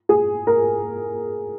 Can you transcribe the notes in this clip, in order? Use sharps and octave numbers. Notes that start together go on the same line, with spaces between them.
G#4
A#4